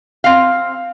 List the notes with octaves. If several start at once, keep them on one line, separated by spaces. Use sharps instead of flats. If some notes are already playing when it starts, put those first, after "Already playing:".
C4 F5